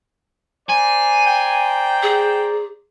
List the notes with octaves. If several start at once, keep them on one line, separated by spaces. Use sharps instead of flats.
C5 D5 G#5 A#5
G5
G#4